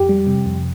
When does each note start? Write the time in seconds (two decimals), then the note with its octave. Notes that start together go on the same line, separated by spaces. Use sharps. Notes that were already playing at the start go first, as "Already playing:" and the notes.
Already playing: F2 G4
0.09 G3
0.27 C3
0.46 F2